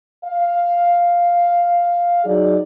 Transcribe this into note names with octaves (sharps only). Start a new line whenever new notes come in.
F5
F#3 D#4 G#4 D5